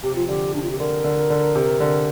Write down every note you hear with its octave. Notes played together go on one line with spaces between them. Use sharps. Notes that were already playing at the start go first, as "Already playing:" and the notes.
C3 G4
F3 F4
D3 G4
C3 D4
F4
G4
D3 A#4
D3
D3
C3
D3